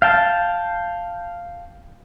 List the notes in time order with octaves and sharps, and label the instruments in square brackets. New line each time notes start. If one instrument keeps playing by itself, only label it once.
[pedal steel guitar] F5 G5 A5